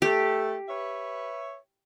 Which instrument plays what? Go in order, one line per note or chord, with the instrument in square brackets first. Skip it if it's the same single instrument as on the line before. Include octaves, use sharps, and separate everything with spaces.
[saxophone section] A3 A4 [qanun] G4
[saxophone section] B4 C#5 E5